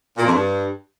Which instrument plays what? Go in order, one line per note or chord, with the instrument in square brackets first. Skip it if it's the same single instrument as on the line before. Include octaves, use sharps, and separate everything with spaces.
[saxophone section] A#2
F2
G2